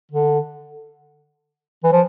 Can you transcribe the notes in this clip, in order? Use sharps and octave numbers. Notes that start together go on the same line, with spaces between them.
D3
E3
F3